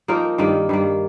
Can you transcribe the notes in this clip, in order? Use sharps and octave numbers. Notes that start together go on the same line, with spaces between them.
F3 A#3 D#4 A#4
G2 D#3 A#3
G2 D#3 A#3